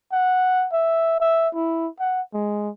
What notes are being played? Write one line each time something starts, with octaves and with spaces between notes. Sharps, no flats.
F#5
E5
E5
E4
F#5
G#3